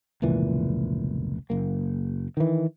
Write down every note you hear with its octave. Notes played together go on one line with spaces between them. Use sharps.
F1 C#2 A#2 E3
F#1 A#3
D#3 E3